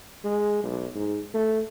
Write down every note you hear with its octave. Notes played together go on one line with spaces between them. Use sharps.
G#3
B1
G#2
A3